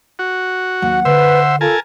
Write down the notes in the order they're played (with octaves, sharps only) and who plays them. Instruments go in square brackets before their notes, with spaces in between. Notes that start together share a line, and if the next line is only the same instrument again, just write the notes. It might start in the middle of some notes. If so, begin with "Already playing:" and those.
[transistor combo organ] F#4
[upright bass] D#2 F#3 [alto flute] F#5
[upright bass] D3 [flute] B4 [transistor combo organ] C5 E5
[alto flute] F4 [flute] A4 [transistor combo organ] A#4 G#5 A5